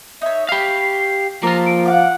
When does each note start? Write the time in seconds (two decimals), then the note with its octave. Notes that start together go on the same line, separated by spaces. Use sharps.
0.22 D#4 C#5 E5
0.49 G4 C#5 F5 B5 C7
1.43 F3 A#3 F4 A4 A5 A#5
1.66 D7
1.86 F5 F#5 D6